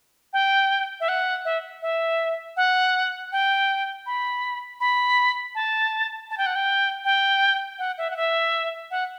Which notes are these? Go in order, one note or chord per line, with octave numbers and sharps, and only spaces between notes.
G5
E5
F#5
E5
E5
F#5
G5
B5
B5
A5
A5
G5
F#5
G5
G5
F#5
E5
F#5
E5
F#5